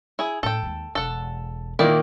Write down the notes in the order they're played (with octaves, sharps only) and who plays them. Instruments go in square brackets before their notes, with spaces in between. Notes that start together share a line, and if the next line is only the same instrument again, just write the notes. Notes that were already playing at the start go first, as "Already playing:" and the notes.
[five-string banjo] E4 G#4
[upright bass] A2 [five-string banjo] A4 G5
[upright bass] D#2 G#3
[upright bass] E1 [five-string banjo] A4 F#5
[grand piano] A#2 D#3 A#3 [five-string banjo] E4 D5